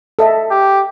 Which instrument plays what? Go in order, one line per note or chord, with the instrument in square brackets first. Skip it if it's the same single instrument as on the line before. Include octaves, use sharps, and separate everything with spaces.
[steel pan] A4 D#5 E5
[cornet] G4